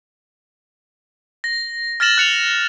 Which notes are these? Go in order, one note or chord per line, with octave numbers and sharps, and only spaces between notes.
A#6
F6 A6 A#6 E7 F#7
F#6 C#7 F7